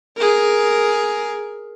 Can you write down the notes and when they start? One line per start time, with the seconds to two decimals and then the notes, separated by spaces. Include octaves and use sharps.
0.17 G#4 A#4